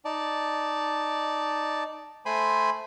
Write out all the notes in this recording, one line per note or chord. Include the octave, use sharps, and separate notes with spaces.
D#4 D5 A5
A3 C5 G#5 B5 C6